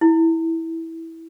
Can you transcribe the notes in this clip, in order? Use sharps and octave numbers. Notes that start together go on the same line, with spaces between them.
E4